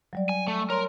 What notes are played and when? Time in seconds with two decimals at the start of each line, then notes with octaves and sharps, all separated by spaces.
0.13 F#3 G3 D5
0.29 G#5
0.48 A3
0.70 A#4 C#5 C6